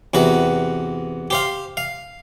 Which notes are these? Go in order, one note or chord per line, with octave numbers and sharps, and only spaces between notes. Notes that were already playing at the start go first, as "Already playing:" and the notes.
E2 C3 F#4 B4
G4 C5 F5
F5